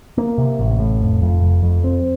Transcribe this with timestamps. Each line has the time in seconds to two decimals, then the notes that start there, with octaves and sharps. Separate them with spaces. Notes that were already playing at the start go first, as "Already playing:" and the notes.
0.18 A#3
0.38 C3
0.59 A1
0.79 A2
1.01 F1
1.22 F2
1.42 F1
1.63 F2
1.84 C4